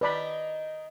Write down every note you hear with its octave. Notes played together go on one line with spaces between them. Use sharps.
D#3 D#4 B4 D5 B5